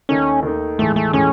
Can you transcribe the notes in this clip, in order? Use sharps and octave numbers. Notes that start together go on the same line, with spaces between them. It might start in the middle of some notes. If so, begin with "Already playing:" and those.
D#2 D#3 A3 C#4 D#4
D#2 D#3 A3 D#4
A2 E3 G#3 A3
A3
A2 E3 G#3 C#4